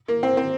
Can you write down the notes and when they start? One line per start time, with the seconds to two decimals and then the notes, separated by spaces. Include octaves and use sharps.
0.08 A#3
0.23 C4
0.37 C4